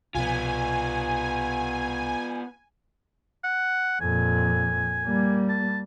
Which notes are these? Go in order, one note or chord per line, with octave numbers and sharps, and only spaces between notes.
C2 B2 F3 B3 F4 G#5
F#5
F2 A#2 G#5
G3 A#3
A5